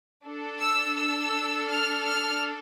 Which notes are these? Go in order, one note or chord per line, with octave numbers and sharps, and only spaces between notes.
D4 A4
E6
E6
F6
F6